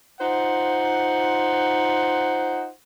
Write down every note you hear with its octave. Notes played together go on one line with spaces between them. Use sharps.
D#4 F4 C5 F#5